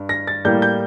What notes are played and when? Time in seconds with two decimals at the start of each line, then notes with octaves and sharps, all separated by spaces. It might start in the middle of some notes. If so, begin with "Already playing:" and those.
Already playing: G2
0.09 A#6
0.27 A6
0.45 A2 G3 A#3 G6
0.62 G6